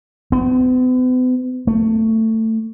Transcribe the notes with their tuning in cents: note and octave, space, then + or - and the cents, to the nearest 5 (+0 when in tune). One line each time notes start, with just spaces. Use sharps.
B3 +45
A3 +20